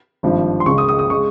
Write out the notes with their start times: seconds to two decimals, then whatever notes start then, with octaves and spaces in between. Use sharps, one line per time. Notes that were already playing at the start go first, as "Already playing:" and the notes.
0.23 G#1 G2 F3
0.60 C6
0.66 C#2 C#3 G#3 C#6
0.78 D#6
0.89 D#6
0.99 D#6
1.10 C#3 G#3 C#6